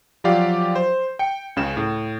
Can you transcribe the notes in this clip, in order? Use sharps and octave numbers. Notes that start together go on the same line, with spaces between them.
F3 F#3 F4 G4 D5 F5
C5
G5 C#7
C#2 C#3 E7
A2